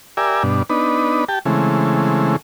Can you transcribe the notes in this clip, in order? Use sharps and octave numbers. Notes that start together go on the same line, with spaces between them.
G4 A#4 D5 E5 G#5
G2 B2 D4
B3 D4 D#4 B4
G4 G5 A5
C#3 E3 G#3 A3 C4